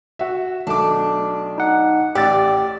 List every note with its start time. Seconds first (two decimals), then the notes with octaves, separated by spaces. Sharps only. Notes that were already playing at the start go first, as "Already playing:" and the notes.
0.19 F#4 E5
0.67 B1 A3 D4 D6
1.58 D#4 F#5
2.15 A1 G4 D5 E6 A6